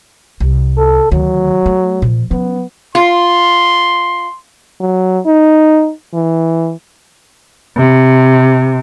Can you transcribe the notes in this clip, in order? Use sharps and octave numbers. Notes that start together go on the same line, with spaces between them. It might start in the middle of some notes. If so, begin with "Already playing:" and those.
C2
A4
D2 D#3 F#3
A3
A#2 F3
F#3 B3 C#4
F4 C6
F#3
D#4
E3
C3